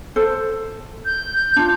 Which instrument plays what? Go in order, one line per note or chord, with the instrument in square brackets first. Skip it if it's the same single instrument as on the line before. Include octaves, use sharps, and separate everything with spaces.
[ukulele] A4 C5
[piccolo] G6
[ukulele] D4 F4